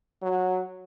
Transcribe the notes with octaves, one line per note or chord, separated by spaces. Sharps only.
F#3